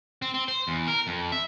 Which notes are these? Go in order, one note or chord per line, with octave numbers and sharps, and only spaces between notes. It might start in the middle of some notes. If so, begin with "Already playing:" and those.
C4
C4
C5
E2
A#4
F2
E5